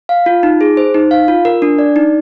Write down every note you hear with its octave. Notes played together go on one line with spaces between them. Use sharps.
F5
F4
D#4
G#4
C5
D#4
F5
F4
A#4
D4
D5
D#4